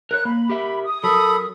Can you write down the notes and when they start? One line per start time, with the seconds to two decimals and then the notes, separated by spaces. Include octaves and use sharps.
0.11 A#4 B4 C#5 F#6
0.25 A#3 B5
0.49 G4 A#4 E5
0.84 D#6
1.04 F#3 A4 A#4 B5